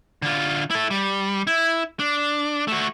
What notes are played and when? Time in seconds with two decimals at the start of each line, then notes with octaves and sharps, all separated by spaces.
0.22 D3 F4
0.70 E4 A4
0.90 G3
1.47 E4
1.99 D4
2.68 A3 F#4